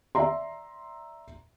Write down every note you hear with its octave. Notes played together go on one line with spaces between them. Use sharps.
D5 E5 A#5 C6